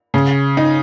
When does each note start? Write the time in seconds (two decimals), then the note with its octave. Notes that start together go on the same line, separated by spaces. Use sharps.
0.14 C#3
0.57 D#4